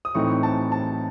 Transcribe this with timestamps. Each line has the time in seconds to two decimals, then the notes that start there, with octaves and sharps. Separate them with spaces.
0.05 D#6
0.15 A2 E3 C4 D#4 C#6
0.43 A5
0.72 A5